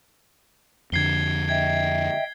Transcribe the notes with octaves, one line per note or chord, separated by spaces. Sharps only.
F2 D3 G#6 C7 G7
D#5 E5 G5 G#6